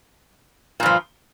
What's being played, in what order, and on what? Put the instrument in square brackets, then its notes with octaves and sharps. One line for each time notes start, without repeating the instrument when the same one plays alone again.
[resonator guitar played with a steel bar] A#2
G2
F3